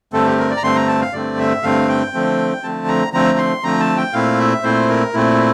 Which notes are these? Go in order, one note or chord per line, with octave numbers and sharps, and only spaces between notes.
G2 D3 A3 C4 A4
G4
A#4
D5
A#5
G2 D3 A3 C4 C6
A#5
A5
F5
G2 D3 A3 C4 D5
E5
G2 D3 A3 C4 F5
G5
D3 F3 A3 C4
D3 F3 A3 C4 A5
A#5
D3 F3 A3 C4 A#5
C6
D3 F3 A3 C4 A#5
A5
G5
A#2 A3 C4 E4 F5
E5
A#2 A3 C4 E4 C5
A#4
A#2 A3 C4 E4